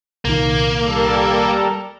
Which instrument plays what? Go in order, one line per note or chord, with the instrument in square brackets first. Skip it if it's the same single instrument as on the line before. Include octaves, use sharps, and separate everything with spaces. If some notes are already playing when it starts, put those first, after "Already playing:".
[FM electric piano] C2 A#2 D#3 [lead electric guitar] A#3
[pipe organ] G3 A4 A#4